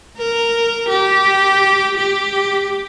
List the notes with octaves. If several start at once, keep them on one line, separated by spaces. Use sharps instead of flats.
A#4
G4
G4